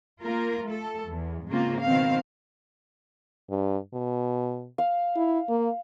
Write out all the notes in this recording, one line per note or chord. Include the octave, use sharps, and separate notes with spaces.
A#3 F4 A#4
A3 A4
E2
G#2 C#3 A#3 C4 F4
B2 D#3 C4 F5
G2
B2
F5
E4
A#3